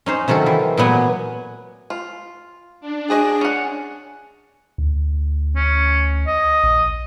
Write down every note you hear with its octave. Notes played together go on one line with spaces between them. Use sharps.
C#4 D#4 C5
C3 D#3 F#3 F4 A4
E3
A#2 F#3 B3 G#5
F4
D4
F#4 G#4 D5 D#5
C#4 F#5
D2
C#4
D#5
A#1